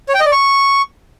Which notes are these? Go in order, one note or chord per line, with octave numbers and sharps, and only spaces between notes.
C#5
G5
D#5
D5
C#6